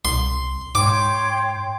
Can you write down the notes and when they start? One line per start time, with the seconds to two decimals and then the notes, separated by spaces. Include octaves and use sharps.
0.05 C2 C6
0.75 G#2 C#5 G5 C6 D6